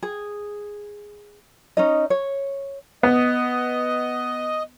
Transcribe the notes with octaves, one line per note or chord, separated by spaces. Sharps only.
G#4
C#4 D#4 D#5
C#5
B3 D#5